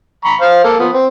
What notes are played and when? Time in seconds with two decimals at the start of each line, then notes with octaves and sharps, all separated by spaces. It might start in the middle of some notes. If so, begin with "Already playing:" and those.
0.25 A#5 B5 C#6
0.41 C5 F5
0.64 A#3 A4
0.79 F3 B3
0.93 C4